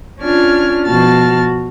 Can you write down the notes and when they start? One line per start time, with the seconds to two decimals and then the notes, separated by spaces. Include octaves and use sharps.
0.20 C#4 D4 F4 F6 G#6
0.84 B2 F3 F#4 A5 F6 A6